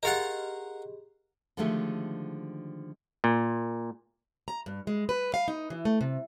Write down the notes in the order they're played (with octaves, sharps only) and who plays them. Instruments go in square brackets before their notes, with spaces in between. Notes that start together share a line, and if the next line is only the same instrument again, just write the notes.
[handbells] G4 G#4 D#5 [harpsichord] A#4 F5 F#5
[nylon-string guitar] D3 D#3 F3 G#3 A3 G4
[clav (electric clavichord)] A#2
[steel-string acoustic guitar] A#5
G2
G#3
B4
F5
D#4
E3
A3
C3